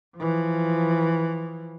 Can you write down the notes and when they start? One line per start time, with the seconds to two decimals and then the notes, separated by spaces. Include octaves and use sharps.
0.16 E3 F3